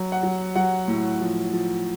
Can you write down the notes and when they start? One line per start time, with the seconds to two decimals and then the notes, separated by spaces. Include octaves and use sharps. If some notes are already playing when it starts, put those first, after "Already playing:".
Already playing: F#3
0.12 F#5
0.23 F#3
0.56 F#3 F#5
0.88 A2
1.21 F3
1.53 F3